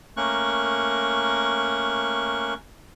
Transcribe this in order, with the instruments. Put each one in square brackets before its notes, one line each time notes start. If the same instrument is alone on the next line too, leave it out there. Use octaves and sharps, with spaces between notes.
[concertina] A3 A#3 C#4 A#4 C#6 F#6